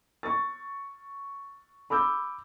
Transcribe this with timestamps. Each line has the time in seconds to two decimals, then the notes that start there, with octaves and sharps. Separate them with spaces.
0.23 C#6 A6
1.90 B5 D6 E6 G6